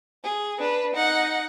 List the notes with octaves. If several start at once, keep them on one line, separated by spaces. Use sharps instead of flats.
G#4
D4 B4
D#4 F#5